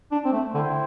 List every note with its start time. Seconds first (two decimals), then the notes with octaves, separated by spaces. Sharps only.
0.12 D4
0.25 C4
0.32 A3
0.53 D3 E4 C5 G5